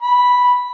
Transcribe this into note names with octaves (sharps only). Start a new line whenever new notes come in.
B5